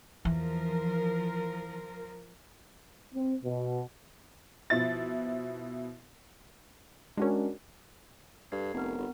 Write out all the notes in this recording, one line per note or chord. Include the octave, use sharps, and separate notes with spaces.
E2 E3 F3 A#4
C4
B2
B2 F3 E4 A6
G#3 C#4 D4 F#4 A#4
G2 A4 G#6 C7
F1 B3 C4 A#4
G1 B3